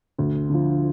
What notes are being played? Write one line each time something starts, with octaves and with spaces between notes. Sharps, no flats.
D2
D3 F3